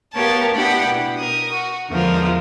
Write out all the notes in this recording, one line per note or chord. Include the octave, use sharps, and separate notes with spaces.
B3 G4 A#4 C#5 F5 A5
B3 D4 E4 G4 F#5 B5
B2
A#4 D#6
F#4
E2 D3 F3 G#3 A#4